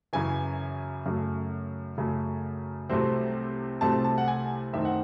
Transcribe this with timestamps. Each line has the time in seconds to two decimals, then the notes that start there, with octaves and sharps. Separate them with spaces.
0.13 F#2 C#3 E3 G#5
1.06 F#2 C#3 F#3 A3
1.98 F#2 C#3 F#3 A3
2.90 C2 C3 F#3 A3 C4
3.81 C2 C3 F#3 A3 C4 A5
4.04 A5
4.18 F#5
4.28 G#5
4.73 F#2 D#3 A3 C4 E5
4.85 F#5